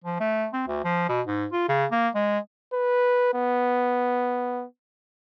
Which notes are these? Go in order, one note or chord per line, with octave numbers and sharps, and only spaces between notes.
F3
A3
C4
D2
F3
B2
G#2
F4
C#3
A#3
G#3
B4
B3